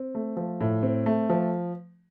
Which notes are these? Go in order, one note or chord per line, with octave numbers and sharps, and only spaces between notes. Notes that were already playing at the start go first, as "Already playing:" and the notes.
Already playing: C4
A3
F3
A2
C4
A3
F3